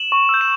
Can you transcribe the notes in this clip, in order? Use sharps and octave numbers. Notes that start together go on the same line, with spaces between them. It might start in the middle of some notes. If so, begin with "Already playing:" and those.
Already playing: E7 F#7
C#6
E6 G6
E7